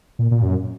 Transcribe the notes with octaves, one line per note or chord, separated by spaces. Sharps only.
A#2
A#2
F#2